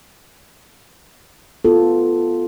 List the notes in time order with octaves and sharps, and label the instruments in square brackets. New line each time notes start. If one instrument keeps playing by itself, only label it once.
[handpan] B3 F4 A4